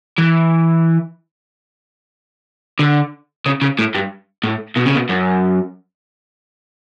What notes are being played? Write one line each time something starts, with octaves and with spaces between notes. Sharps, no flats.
E3
D3
C#3
C#3
A2
G2
A2
B2
C#3
B2
F#2